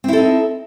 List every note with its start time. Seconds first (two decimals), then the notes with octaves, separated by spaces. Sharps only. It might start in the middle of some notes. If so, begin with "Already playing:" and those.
0.04 C4
0.08 E4
0.13 A4
0.17 D#4